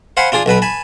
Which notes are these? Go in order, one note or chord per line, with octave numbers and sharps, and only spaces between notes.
C5 F5 F#5 G#5 B5
D4 F4 G#4 D5
B1 B2 B4 B5
G#5 A5 B5